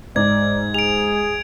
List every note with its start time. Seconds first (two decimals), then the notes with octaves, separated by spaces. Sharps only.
0.16 G#2 D5 G#6
0.74 G#4 D7 F7